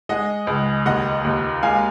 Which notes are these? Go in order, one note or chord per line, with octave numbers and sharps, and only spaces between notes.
G#3 D#5 F#5
C#2
D#2 D#5 F#5
D#2
G#3 F5 G#5